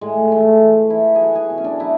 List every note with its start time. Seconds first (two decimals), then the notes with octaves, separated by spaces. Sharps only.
0.01 A2 G#3
0.32 E3 A3
0.61 E3
0.90 E3 E4
1.15 F#3 F#4 G#4
1.35 G#4
1.49 B2 E4
1.58 C#4
1.64 D4
1.79 F#3 E4